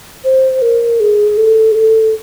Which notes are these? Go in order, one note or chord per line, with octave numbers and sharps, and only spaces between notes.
C5
A#4
G#4
A4
G#4
A4